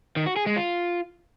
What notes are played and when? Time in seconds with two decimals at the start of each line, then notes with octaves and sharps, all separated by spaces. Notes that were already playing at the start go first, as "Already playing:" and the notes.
0.16 D#3
0.26 F#4
0.36 G#4
0.46 G#3
0.56 F4